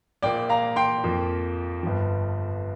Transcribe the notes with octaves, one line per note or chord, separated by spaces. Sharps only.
A#1 A#2 A#3 D5 G5
F5 A#5
G5 C6
F2 F3 A#3
G1 G2 F3